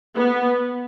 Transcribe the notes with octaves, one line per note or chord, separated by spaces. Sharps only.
B3